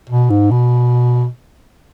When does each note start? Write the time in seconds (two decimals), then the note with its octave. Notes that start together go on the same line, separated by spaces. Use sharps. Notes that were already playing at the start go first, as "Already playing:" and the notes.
0.09 B2
0.30 G#2
0.51 B2